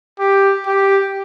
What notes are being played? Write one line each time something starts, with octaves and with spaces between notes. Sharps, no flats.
G4
G4